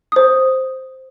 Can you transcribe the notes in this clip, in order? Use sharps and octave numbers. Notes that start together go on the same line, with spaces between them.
C5 D#6